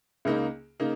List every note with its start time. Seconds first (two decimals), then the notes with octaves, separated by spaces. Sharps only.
0.25 C#2 C#3 A#3 D#4
0.80 C#3 A#3 D#4